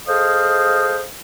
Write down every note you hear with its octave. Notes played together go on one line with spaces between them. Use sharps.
G#4 A4 C5 D#5 F5